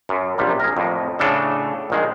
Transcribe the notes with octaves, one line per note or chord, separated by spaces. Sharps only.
F#2
A#1 C3 G3
G#4 A#4
F2 A2
A2 C#3 D4 A4
A#1 D#3 G#3